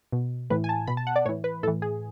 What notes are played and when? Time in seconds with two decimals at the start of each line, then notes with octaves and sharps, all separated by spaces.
0.12 B2
0.50 A2 E3 B4
0.64 G#5
0.69 A5
0.87 B2 B5
0.97 A5
1.07 F#5
1.16 D5
1.25 A2 C#5
1.29 E3
1.44 B4
1.63 A2 A4
1.68 E3
1.82 G#4